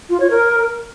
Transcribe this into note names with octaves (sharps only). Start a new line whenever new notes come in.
F4
C#5
A#4